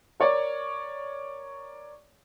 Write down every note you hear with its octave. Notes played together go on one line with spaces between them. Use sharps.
A#4 C#5 D5